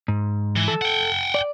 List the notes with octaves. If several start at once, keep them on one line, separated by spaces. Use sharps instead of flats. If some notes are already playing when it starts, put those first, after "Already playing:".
G#2
E3
A4
F#5 G5
D5